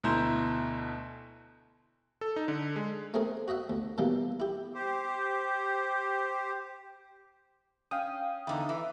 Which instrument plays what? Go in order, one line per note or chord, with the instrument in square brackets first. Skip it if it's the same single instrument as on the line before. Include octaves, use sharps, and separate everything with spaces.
[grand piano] D2 B2 E4 A#5 C6 G6
[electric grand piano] A4
D#4
D3
G#3
[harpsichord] A3 C4 G#4 A#4
F#4 D#5 E5 F#5
D2
B2 D#3 E3 G3 A#3
E4 G4
[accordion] G4 C5
[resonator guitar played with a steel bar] C#4 [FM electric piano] F5 G5 D#6
[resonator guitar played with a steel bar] E2 D3 D#4
E3